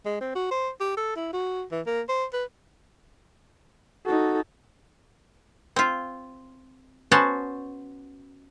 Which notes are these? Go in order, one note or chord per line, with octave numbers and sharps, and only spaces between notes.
G#3
C4
F#4
C5
G4
A4
E4
F#4
E3
A#3
C5
B4
D#4 F#4 A4
C4 F4
B3 C#4 F#4 C5 A5